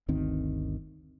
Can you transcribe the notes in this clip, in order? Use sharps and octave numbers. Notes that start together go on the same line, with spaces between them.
G1 D2 D#3 C4